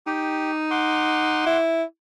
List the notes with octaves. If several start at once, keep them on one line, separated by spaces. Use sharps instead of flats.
D#4 G4 G5
F#5 C6 D6
E4